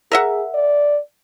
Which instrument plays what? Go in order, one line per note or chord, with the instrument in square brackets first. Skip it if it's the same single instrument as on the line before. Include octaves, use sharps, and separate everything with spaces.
[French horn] G#4 [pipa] A#4 E5 F#5
[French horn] D5